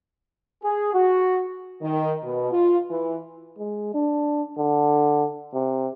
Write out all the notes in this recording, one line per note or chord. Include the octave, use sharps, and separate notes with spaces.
G#4
F#4
D#3
B2
F4
E3
G#3
D4
D3
C3